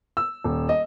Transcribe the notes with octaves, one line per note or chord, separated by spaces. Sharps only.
E6
D#1
D#5